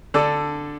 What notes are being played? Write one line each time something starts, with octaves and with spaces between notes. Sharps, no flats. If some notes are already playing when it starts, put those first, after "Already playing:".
D3 A4 D5